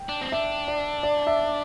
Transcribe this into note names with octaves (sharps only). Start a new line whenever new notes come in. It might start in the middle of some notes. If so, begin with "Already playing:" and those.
Already playing: G5
D4
C4
D4 E5
D5
D5
E5